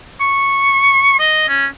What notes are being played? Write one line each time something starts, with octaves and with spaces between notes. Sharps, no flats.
C#6
D#5
C#4